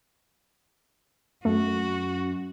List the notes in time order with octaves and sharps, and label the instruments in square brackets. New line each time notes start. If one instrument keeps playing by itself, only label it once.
[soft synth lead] F#2 [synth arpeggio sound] A3 [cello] F#4